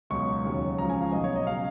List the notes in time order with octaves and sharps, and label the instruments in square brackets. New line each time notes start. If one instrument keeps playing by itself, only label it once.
[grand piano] C#2 B2 F#3 C#6
D#2 C#3 F#3
C#2 C#3 F3 A#5
G#5
F5
B1 B2 F#3 D#5
C#5
D#5
C#3 F#3 F5